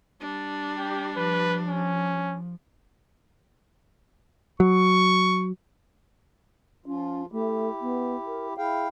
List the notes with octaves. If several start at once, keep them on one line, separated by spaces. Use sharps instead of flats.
G3 D4
G4
F3 B4
C#4
F#3 C#6
F3 C#4 F4
A3 E4 G4
B3
A#4
E4 G#4 F5 G5